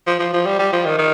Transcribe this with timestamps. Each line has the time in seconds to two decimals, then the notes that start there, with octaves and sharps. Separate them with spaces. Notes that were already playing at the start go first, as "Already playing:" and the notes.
0.07 F3
0.19 F3
0.33 F3
0.46 G3
0.59 G3
0.73 F3
0.86 D#3
0.99 D#3